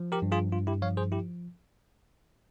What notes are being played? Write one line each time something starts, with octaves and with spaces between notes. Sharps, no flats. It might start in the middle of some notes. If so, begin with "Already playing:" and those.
Already playing: F3
G4 A#4
G2
F4 G#4
G2 F4
E4 G4
F3 C#5 F5
G#4 C5
E4 G4